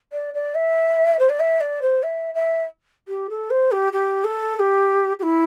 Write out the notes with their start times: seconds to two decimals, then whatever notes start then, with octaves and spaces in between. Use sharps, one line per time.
0.13 D5
0.34 D5
0.55 E5
1.19 C5
1.29 D5
1.40 E5
1.60 D5
1.82 C5
2.03 E5
2.34 E5
3.08 G4
3.30 A4
3.50 C5
3.71 G4
3.93 G4
4.24 A4
4.56 A4
4.59 G4
5.19 G4
5.23 E4